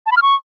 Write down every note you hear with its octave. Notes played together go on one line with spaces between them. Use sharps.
A5
B5
F6
C#6